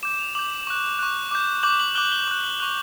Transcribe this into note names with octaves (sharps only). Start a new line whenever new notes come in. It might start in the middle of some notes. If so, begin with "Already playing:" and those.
D6 G6 E7
F7
D6 G6 F#7
C#6 F#6
C#6 F#6
D6 G6
D6 G6 F#7
F#7
D6 F#6 G7
F#7
G7
D6 F#6
F#7
C#6 F#6 F7